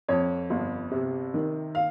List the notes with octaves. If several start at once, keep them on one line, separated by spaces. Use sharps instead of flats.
F2 C#5
G1
C3
D#3
F5